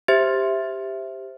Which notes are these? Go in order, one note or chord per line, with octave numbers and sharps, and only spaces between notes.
G4 C5 E5 A6